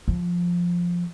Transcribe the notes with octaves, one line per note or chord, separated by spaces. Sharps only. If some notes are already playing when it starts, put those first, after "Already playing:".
F3